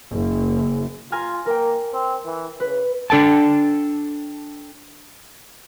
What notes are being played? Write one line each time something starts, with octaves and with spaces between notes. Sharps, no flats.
F#1
F4 G#5 A#5 F6
A#3 A#4 G5
C4
E3
C#3 B4
D4 A4 G5 A5